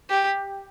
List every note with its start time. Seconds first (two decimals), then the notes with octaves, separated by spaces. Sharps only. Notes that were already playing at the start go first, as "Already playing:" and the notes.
0.10 G4